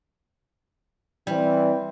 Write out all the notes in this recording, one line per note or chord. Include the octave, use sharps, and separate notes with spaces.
E3 G3 C4